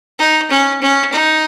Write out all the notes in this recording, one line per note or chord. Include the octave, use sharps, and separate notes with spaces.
D#4
C#4
C#4
D#4